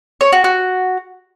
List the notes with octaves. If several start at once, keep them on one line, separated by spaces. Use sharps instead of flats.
C#5
F#4
F#4